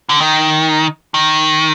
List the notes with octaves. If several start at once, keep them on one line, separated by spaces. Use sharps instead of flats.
D3
D#3
D#3